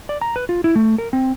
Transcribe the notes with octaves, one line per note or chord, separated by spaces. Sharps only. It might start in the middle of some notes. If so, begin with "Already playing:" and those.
D5
A#5
B4
F4
E4
A3
A#4
C4